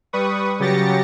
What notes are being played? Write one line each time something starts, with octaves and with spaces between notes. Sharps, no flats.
G3 B4 C#6 D#6
C#3 F#3 G4 A6 A#6 C#7